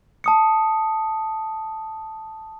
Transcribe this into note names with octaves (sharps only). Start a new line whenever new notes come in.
A5 D#6 C#7